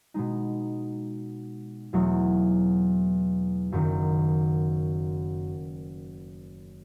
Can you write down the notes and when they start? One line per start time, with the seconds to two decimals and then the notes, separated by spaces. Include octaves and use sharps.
0.14 B2 G#3 D#4
1.93 E2 B2 F#3 A3
3.72 F#1 F#2 D#3